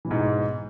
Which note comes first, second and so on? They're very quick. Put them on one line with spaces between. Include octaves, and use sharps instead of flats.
E3 B2 G#2